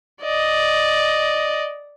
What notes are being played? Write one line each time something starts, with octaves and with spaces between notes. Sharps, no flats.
D5 D#5